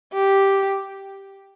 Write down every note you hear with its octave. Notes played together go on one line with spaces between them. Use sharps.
G4